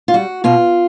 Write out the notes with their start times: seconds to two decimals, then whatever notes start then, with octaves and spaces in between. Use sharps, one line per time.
0.08 F4
0.13 G3 F#4
0.44 B2 F4